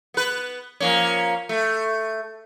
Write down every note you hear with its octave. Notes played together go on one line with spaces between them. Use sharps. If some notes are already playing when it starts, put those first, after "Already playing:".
B3 B4
F3 A#3 C#4
A3